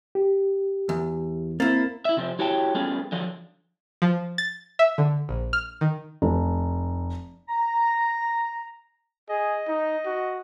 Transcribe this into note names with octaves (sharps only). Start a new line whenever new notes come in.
G4
E2
A#3 C4 E4 A6
E4 E5
C3 F3 C4
E4 F#4 G4 C#5 G5 A5
G3 B3 C#4 F4 G#4 A4
D3 F3 F#3
F3
A6
E5
D3
A#1
F6
D#3
F1
A#5
G#4 D#5
D#4
F#4